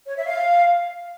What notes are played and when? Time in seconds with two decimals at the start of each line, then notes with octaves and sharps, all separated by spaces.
0.07 C#5
0.17 E5
0.26 F5